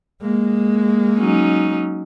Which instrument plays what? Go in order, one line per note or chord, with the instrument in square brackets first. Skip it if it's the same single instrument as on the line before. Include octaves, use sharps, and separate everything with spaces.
[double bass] G#3 A#3
[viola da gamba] F#3 C#4 D#4